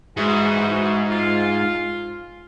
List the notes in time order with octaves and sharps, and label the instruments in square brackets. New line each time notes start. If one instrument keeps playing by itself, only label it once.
[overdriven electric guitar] G#2 [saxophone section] E3 F#4
[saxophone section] F4